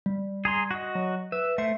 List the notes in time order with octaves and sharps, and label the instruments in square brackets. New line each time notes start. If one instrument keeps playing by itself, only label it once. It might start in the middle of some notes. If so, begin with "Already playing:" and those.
[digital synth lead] G3
[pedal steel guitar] G#4 A#5 C6
F#4 D#5
[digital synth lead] F#3
[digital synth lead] B4 [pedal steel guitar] E5
[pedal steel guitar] A3 C5 [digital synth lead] E5